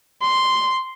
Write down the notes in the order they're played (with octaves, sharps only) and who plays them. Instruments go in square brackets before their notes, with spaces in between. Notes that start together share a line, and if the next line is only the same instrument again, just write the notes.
[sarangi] C6